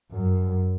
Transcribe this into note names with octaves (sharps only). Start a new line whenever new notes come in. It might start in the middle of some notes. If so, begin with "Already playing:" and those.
F#2